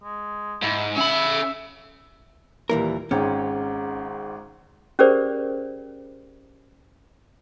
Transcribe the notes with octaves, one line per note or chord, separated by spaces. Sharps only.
G#3
G#2 E4
C#4 E5 B5
D#2 A#2 E3 G3 A#4
G#1 G#2 C#4 G5
C#4 G4 G#4 A#4 C5 D5